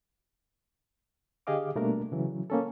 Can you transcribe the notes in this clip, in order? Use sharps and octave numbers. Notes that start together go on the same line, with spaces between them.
D3 G4 G#4 D#5 F5 D6
B2 G3 A3 A#3 D4 A#4
C#3 E3 F#3
A#3 C#4 A4